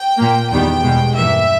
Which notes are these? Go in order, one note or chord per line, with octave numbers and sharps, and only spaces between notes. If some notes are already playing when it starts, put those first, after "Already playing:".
Already playing: G5
A#2 A#3
E2 D#3 G3 B3 G5
E2 B2 G#3
G2 E3 A#3 E5